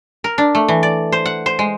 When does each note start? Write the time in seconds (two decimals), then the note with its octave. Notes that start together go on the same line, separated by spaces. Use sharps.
0.24 A#4
0.38 D4
0.55 A3
0.68 E3
0.83 D5
1.12 C5
1.26 F#5
1.46 C5
1.59 G#3